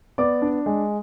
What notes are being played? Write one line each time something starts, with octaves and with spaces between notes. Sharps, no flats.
B3 D5 D6
D4
G#3